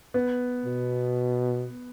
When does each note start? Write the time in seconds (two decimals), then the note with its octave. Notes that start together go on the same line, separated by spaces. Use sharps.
0.14 B3
0.66 B2